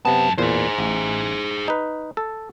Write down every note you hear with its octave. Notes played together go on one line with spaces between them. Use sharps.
F#2 C3 B3 A5
E2 A#2 G#4 C5
A1
D#4 B4
A4